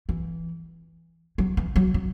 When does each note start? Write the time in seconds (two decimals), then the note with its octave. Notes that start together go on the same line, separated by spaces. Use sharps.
0.09 E3
1.38 F#3
1.57 E3
1.76 F#3
1.94 F#3